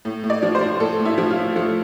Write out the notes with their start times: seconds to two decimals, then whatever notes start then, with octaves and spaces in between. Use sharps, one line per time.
0.05 A2
0.24 A2
0.30 D5
0.43 F3
0.55 C5
0.61 F3
0.80 A2 A4
0.99 A2
1.05 E4
1.18 F3
1.31 F4
1.37 A2
1.56 F3 A3